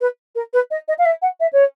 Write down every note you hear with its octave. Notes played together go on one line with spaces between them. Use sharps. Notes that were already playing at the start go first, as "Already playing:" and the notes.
B4
A#4
B4
D#5
D#5
F5
E5
F#5
E5
C#5